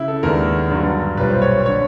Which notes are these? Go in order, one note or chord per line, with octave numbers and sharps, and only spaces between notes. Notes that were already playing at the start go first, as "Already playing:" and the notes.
Already playing: C#3 E4
A4
D#2 D#3 G#3 B3 D4 A#4
G2 D3 F#3
B1 A#2 G3 B4
C5
C#5
D3 C#5